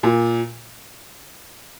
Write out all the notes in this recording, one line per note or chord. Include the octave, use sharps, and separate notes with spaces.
A#2